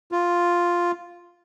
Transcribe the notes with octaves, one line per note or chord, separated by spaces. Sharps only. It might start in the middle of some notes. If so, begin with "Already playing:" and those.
F4